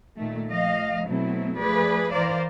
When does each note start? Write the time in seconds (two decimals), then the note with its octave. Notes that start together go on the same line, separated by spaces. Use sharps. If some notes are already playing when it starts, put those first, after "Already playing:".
0.17 A#2 D#3 A3
0.51 F3 A3 D#5 F5
1.06 B2 F#3 A3 C4 E4
1.58 F3 A3 G#4 B4 D5
2.12 E3 A#4 C5 D5 F5